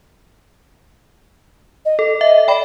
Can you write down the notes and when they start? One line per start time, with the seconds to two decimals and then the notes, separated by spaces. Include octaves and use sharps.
1.85 D#5
1.99 A4
2.21 D#5 E5
2.48 D5 G5 B5